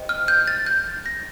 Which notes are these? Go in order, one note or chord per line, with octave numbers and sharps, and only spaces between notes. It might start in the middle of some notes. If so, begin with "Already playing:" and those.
Already playing: C5 D#5 G5
F6
G6
A6
G6
A#6